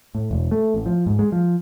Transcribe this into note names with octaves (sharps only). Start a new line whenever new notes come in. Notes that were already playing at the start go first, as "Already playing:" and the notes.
A2
E1
A3
A1
F3
G#2
G#3
F3